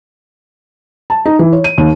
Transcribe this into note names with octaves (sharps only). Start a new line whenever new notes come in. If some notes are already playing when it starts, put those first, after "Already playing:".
A5
D#4
E3
C#5
D#7
D#2